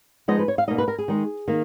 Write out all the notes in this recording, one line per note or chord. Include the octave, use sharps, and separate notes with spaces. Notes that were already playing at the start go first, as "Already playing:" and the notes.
F3 G#3 B3 D#4 D#5
B4
C#5
F5
B2 A#3 D#4 D#5
B4
A#4
G#4
D#3 G#3 D#4
D#3 A#3